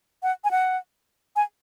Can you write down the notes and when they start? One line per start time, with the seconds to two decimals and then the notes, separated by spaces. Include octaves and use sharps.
0.23 F#5
0.44 G#5
0.51 F#5
1.36 G#5